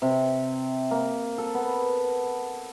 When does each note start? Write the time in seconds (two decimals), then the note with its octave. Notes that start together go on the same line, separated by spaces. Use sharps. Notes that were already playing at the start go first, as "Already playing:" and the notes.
0.02 C3
0.91 A#3
1.38 A4
1.54 B3